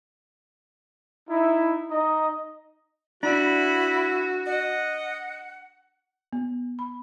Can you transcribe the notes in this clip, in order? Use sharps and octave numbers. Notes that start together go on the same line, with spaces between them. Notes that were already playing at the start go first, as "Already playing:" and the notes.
D#4 E4
D#4 D#5
D4 E4 F#4 B5
D#5 F#5
B3
B5